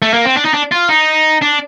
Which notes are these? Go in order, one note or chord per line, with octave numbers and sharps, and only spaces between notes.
A3
A#3
C4
D4
D#4
D4
F4
D#4
D4